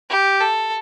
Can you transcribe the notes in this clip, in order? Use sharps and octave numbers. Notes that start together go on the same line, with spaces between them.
G4
A4